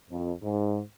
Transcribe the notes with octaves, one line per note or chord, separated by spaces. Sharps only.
F2
G#2